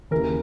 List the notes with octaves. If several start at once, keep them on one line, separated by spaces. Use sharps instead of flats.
D#2 C#3 E3 A#4